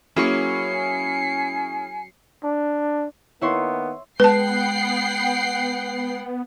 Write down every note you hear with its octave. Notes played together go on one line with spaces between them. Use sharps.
F#3 A#3 C#4 E4 G#4 C#6 C7 C#7
G#5
D4
D#3 A#3 B3 E4 C#5 C6
G#3 B3 B4 F#5 G5 A5 F#6 C7